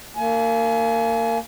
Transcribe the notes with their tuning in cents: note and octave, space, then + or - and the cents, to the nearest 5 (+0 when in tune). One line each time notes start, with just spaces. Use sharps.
A#3 -25 G#5 +30